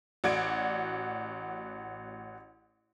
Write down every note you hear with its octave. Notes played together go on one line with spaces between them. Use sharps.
A1 F#4 D5 G#6 D7